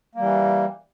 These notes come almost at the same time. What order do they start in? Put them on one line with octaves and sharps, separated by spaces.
A#3 G3 E3